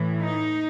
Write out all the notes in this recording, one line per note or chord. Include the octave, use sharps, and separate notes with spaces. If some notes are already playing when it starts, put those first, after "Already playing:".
Already playing: A2 E3
D#4